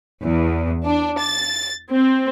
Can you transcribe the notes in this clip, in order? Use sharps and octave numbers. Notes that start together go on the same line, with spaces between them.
E2
D4
A6
C4